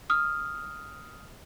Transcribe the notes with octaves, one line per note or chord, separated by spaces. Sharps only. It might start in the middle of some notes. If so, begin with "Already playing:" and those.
D#6 F6